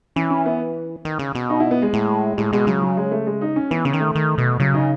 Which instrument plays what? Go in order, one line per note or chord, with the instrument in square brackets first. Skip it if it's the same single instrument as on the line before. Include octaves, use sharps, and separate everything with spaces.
[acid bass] E3 [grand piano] C#4
[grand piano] C#4
B3
[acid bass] D#3
C#3
B2
[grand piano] D#4
E4
B3
G#3
[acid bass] A2
[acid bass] A2 [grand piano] G#3
[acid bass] B2 [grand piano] G#3
[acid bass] C#3 [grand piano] F#3
[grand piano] F#3
G#3
A3
G#3
D#4
C#4
[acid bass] E3 [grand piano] B3
[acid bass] C#3 [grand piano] C#4
[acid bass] D#3
[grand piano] A3
[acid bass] D#3
B2
[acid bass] C#3 [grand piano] F#3
[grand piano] D#4